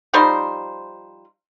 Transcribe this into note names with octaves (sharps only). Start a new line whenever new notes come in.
F3 G3 D#4 C5